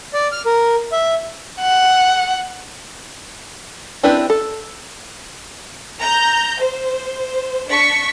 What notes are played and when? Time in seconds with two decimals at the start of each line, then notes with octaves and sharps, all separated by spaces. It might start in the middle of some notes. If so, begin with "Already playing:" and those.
0.14 D5
0.32 F6
0.46 A#4
0.92 E5
1.61 F#5
4.03 C4 D4 E4 G4 B4
4.30 A4
6.00 A#5 G6
6.59 C5
7.68 D4 C#6 B6